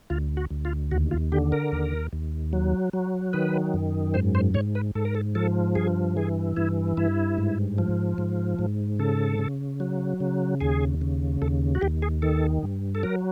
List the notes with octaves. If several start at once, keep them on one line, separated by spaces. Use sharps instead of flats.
D2 F4
F#4
D2
F4
D#2 F#4
F4
D3 G4
A#4
D#2
D#2
F#3
F#3
D#3 B4
F#2
G#2 C5
C5
G#2 C#5
B4
G#2 A4
A#4
A4
F3 A4
G2 G#4
E3 G#4
G2 E4
G2 E4
G#2
F3
G#2
G#2
C#3 A4
C#3
F#3
C#3
D#2 G#4
C#3
D#2 A4
F#4
D#2 G4
G#4
D#3 A4
G2
A4
F#3 A#4